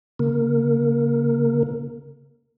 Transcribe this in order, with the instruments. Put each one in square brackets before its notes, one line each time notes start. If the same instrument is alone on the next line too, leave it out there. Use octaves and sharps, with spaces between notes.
[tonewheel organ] C#3 A#3 A#4